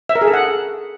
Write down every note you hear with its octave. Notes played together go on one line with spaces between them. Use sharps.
E5
A#4
G#4
A4
F#5